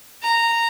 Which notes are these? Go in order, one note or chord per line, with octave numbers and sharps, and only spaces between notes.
A#5